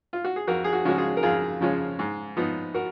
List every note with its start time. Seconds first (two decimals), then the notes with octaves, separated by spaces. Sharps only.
0.13 F4
0.24 F#4
0.36 G#4
0.47 F2 F#4 A#4
0.64 G#4
0.73 F#4
0.85 C#3 F3 G#3 C#4 F#4
0.98 F4 G#4
1.17 A#4
1.23 F2 F4 G#4
1.60 C#3 F3 G#3 C#4
1.99 G#2
2.37 F3 B3 D#4
2.74 F#4 A#4